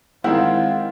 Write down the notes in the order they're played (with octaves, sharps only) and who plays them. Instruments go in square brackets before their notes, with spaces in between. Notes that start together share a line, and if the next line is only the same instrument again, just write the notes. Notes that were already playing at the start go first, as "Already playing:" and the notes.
[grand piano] D#3 G#3 C4 [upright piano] E4 A#4 [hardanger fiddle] F4 [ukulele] F#5